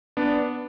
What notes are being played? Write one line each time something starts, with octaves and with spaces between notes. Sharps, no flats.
B3 D4